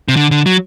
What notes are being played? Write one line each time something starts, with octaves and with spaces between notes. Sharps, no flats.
C3
D3
D3
F#3